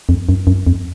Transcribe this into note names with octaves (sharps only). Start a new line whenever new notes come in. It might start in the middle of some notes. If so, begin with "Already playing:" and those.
F2
F#2
F#2
F2